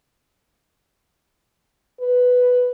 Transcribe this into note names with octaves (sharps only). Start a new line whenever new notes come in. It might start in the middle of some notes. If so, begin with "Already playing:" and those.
B4